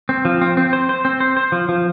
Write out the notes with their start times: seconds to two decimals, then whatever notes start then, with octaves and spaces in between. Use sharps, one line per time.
0.09 C4
0.25 F3
0.42 C4
0.57 C4
0.73 C5
0.89 C5
1.05 C4
1.20 C5
1.37 C5
1.52 F3
1.69 F3